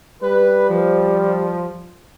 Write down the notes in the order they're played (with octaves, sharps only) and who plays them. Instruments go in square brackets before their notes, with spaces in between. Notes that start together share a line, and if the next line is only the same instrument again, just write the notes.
[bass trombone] G3 [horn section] B4
[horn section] F3